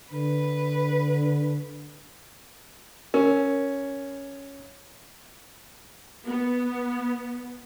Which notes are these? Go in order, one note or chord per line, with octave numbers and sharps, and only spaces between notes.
D3 B4
C#4 A#4
B3